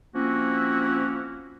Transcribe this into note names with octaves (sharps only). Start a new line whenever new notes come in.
F3 A#3 C4 C#4 E4 F#4